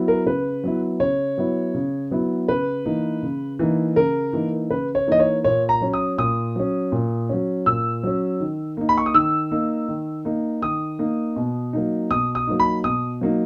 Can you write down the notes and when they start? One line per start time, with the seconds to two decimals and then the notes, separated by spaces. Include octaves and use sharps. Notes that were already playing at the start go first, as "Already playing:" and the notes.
Already playing: F#3 B3 E4
0.08 A#4
0.26 C#3 B4
0.64 F#3 B3 E4
1.00 C#3 C#5
1.38 F#3 B3 E4
1.74 C#3
2.11 F#3 B3 E4
2.48 C#3 B4
2.85 E3 A#3 D#4
3.23 C#3
3.59 E3 A#3 D#4
3.96 C#3 A#4
4.33 E3 A#3 D#4
4.70 C#3 B4
4.95 C#5
5.07 E3 A#3 D#4 D#5
5.20 C#5
5.44 A#2 C#5
5.69 A#5
5.81 F#3 C#4
5.93 D#6
6.18 A#2 D#6
6.56 F#3 C#4
6.92 A#2
7.29 F#3 C#4
7.66 A#2 E6
8.03 F#3 C#4
8.40 D#3
8.77 A#3 D#4
8.89 B5
8.98 C#6
9.06 D#6
9.14 D#3 E6
9.51 A#3 D#4
9.88 D#3
10.25 A#3 D#4
10.62 D#3 D#6
10.99 A#3 D#4
11.36 B2
11.73 F#3 A#3 D#4
12.10 B2 D#6
12.35 D#6
12.47 F#3 A#3 D#4
12.60 B5
12.84 B2 D#6
13.21 F#3 A#3 D#4